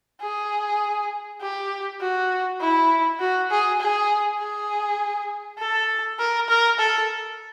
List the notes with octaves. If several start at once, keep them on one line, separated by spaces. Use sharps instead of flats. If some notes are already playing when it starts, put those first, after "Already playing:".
G#4
G4
F#4
E4
F#4
G#4
G#4
G#4
A4
A#4
A#4
A4